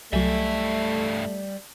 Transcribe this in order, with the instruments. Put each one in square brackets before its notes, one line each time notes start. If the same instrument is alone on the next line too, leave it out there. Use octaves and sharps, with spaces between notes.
[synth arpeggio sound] C2 F#3 [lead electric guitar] G2 E5 [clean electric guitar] G3 G#5 [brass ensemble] A3